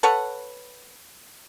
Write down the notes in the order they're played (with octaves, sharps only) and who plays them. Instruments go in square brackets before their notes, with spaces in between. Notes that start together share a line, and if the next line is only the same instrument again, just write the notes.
[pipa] A4 B4 C#5 F#5